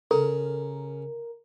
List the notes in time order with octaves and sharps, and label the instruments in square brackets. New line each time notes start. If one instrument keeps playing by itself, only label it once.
[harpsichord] C#3 [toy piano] A4 [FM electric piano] A#4